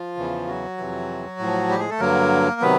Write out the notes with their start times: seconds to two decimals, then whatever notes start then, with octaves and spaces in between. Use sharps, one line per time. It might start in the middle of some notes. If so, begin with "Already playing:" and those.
Already playing: F3 F4
0.16 E2 C#3 E3
0.47 F#3 F#4
0.78 F2 C3 E3
1.39 A2 F3
1.69 G3 G4
1.79 G#3 G#4
1.90 A3 A4
2.00 G2 D3 F#3 A#3 A#4
2.60 C3 D#3 F#3 B3 B4